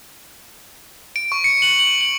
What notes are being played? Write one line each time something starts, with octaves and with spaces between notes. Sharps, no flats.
D7
C#6
C#7
F#7
F#7
F#7